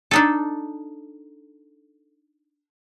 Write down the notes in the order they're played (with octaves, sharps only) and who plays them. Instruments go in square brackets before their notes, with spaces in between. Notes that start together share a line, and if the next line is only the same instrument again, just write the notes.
[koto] D4 D#4 A4